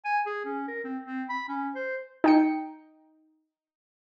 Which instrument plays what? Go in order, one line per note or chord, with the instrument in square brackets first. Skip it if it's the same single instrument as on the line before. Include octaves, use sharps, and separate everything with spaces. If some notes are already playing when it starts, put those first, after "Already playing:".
[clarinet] G#5
G#4
C#4
A#4
C4
C4
B5
C#4
C5
[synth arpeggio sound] D#4 G5 C#7